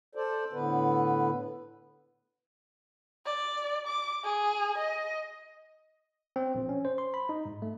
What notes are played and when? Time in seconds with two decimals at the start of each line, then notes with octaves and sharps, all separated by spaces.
0.15 A4 C5 D5
0.52 A2 D3 B3 B4
3.26 D5
3.87 D6
4.24 G#4
4.78 D#5
6.36 C4
6.55 A#1
6.69 C#4
6.85 C5
6.98 C6
7.14 B5
7.29 D#4
7.45 G#2
7.62 A3